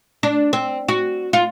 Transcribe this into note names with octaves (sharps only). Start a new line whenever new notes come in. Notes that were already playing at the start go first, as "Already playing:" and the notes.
D4
C4
F#4
F4